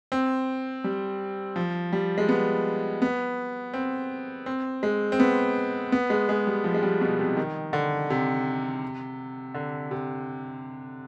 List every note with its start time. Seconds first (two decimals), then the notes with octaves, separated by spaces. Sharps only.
0.12 C4
0.84 G3
1.56 F3
1.93 G3
2.18 G#3
2.29 B3
3.02 B3
3.74 C4
4.46 C4
4.83 G#3
5.12 C4
5.20 B3
5.92 B3
6.10 G#3
6.29 G#3
6.47 G3
6.64 F3
6.74 G#3
6.83 G3
7.01 B2
7.19 C3
7.37 D#3
7.73 D3
8.10 C3
9.54 D3
9.91 C3